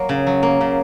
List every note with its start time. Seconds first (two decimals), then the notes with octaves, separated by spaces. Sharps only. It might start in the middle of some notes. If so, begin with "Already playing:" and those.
Already playing: F#3 A#3
0.09 C#3
0.27 F#3
0.43 A#3
0.61 C#3